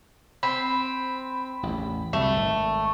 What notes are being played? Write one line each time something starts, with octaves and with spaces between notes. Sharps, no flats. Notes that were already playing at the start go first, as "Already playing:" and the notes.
C4 B5
A1 E2
C2 F#2 D3 A3
G#1